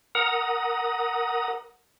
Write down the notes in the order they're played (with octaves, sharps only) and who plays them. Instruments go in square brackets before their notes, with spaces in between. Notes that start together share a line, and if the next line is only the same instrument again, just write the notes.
[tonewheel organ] A#4 F#5 A#5 D#6